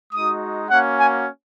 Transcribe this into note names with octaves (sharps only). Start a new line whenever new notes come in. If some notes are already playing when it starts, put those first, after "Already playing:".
G#3 D#4 F#4 D#6
A#3 C#4 F#4 F#5
G#5